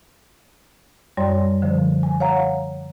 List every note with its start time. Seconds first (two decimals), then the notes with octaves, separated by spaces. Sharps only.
1.17 F#2 G3 C#5 D5 C6
1.62 D3 F3 C5
2.03 G#5
2.20 C#5 F5 F#5 A#5